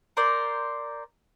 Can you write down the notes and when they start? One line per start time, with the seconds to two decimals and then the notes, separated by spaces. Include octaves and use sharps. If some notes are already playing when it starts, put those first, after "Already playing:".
0.17 A#4 C5 D5